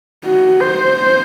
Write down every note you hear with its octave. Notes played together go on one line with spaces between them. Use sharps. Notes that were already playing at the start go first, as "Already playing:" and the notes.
F#4
C5